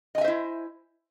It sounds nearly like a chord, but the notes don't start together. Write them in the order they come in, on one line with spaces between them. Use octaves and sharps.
D#5 G#5 E5 C5 E4